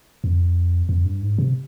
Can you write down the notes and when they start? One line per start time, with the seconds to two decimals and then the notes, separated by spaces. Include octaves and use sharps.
0.24 F2
0.89 F2
1.05 G2
1.22 G#2
1.38 C3